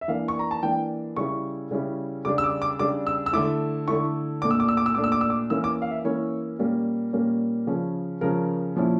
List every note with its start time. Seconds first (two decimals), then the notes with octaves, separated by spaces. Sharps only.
0.01 E5
0.08 E3 A#3 D4 F5
0.28 C#6
0.39 A#5
0.51 A5
0.63 E3 A#3 D4 G5
1.16 C#3 G3 C#4 E4 C#6
1.71 C#3 G3 C#4 E4
2.25 C#3 G3 D4 D6
2.38 E6
2.44 D6
2.62 D6
2.79 C#3 G3 D4 D6
3.07 E6
3.26 E6
3.33 D3 A3 E4 D6
3.88 D3 A3 E4 C#6
4.42 A#2 A3 D4 D6
4.51 E6
4.60 D6
4.68 E6
4.77 D6
4.86 E6
4.95 A#2 A3 D4 D6
5.04 E6
5.12 D6
5.21 E6
5.30 D6
5.50 E3 A#3 C#4 E4 E6
5.64 D6
5.82 F5
5.91 E5
6.04 E3 A#3 C#4 E4 C#5
6.59 A#2 G3 A#3 C#4
7.13 A#2 G3 A#3 C#4
7.67 C#3 F3 C#4
8.21 C#3 F3 C#4 A#4
8.75 A#2 F3 C#4 E4